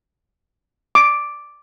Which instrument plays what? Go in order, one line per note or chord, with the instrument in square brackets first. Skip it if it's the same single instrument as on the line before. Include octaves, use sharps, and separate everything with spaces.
[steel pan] D6